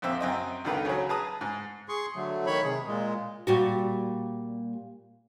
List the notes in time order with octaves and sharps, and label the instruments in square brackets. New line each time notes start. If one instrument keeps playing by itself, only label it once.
[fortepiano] A#1 F2 C4 E5 E6
F#2 C4 D#5
C#2 D3 D#3 B4 F5
C#3 F#3
G#4 B4 A5 A#5 D#6
G#2
[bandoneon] G#4 C6 C#6
D3 F#3 A3
D#3 C#5 B5
C3 G#4
A#2 G#3
[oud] A#2 G3 F#4